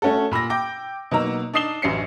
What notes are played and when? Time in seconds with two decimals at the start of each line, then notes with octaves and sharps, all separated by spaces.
0.02 A3 C#4 F#4 A4
0.31 A#2 B5 E6 A#6
0.50 G5 D6 A#6
1.11 B2 F#3 A#3 D#4 A#5 E6
1.54 D4 D#4 D#6 C7 E7 G7
1.82 A1 F#2 C#4 C7 C#7